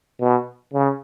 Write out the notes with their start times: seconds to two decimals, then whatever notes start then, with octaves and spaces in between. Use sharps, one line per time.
0.20 B2
0.74 C#3